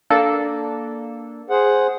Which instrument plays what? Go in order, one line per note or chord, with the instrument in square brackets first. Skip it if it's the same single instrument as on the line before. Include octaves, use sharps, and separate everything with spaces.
[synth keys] A#3 D4 A4
[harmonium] G#4 C5 F#5